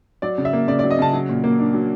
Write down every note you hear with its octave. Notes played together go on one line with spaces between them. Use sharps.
F#3 D5
C#3
E5
A#3
C#3 D5
F#3 D5
D#5
C#3 A5
F#3
A#2
A#3
D4
F#3